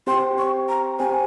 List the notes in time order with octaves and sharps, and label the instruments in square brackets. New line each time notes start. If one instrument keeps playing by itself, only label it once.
[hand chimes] C4 G4 C5 G5 [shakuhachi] C6
[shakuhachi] C#6
A#5
[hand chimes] C4 G4 C5 G5 [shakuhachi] G#5